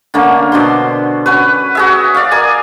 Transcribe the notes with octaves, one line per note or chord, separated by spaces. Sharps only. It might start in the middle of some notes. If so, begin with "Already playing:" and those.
D3 A3 A#3 C#4
B2 D4 C5 C6
C#4 F#4 B4
F#4 G#4 E5
D5 F5
A#4 D5 G#5